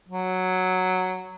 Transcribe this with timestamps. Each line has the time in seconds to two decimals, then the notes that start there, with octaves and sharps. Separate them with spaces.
0.09 F#3